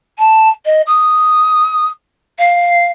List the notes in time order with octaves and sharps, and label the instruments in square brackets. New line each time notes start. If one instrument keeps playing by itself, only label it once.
[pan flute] A5
D#5
D#6
F5